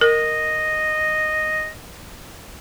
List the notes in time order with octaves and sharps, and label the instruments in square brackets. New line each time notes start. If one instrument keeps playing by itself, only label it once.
[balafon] A#4 [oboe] D#5